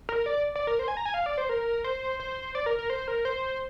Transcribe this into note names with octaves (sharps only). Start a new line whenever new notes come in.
A#4
D5
D5
A#4
C5
G#5
A#5
G#5
F5
D5
C5
A#4
C5
C5
D5
A#4
A#4
C5
A#4
C5